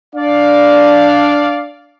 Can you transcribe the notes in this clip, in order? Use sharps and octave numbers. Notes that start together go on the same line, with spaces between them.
D4 D5 F5